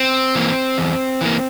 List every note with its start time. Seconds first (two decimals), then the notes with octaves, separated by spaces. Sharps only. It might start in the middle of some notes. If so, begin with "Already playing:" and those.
Already playing: C4
0.35 E3 A#3
0.78 E2
1.21 E3 A#3